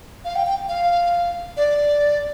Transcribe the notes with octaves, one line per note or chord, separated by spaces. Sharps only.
F5
G5
G5
F5
D5